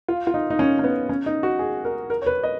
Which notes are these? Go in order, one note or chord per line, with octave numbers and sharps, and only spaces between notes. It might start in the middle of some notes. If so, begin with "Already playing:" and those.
F4
F4
D#4
D#4
C#4
C#4
B3
C#4
D#4
F#4
G#4
A#4
A#4
C#5
B4
D#5